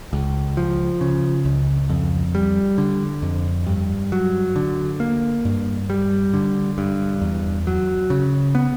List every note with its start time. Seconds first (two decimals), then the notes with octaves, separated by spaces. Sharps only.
0.13 C#2
0.57 F3
1.01 C#3
1.45 C#2
1.90 F2
2.35 G3
2.78 D3
3.22 F2
3.67 G2
4.12 F#3
4.56 D3
5.00 A#3
5.45 G2
5.90 G3
6.34 D3
6.78 G2
7.21 E2
7.67 F#3
8.10 C#3
8.55 B3